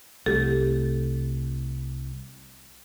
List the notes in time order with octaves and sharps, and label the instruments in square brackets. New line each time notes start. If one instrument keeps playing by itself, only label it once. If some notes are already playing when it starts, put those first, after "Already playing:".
[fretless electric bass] C2 A3 [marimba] G4 A4